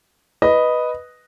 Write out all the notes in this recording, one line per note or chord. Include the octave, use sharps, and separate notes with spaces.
B4 D#5